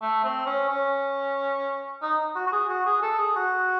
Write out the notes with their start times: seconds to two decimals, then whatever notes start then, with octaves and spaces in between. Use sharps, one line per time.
0.02 A3
0.24 C4
0.46 C#4
0.69 C#4
2.02 D#4
2.35 F#4
2.47 F#4
2.53 G#4
2.69 F#4
2.86 G#4
3.03 A4
3.19 G#4
3.36 F#4